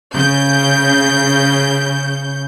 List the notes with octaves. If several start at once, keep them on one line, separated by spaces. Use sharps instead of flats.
C#3 G6